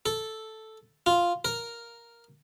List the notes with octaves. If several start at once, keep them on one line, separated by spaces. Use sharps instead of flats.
A4
F4
A#4